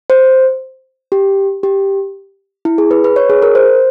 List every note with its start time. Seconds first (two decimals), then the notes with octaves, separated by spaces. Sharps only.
0.10 C5
1.12 G4
1.63 G4
2.65 E4
2.78 G#4
2.91 B4
3.04 B4
3.16 C#5
3.30 G#4
3.42 A#4
3.55 C5